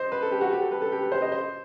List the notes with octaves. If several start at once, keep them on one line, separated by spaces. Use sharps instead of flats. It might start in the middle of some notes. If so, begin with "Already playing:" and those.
Already playing: C5 D#5
B4
A4
G4
F#4
G4
A4
B4
A4
G4
B4
C5
D#5
C5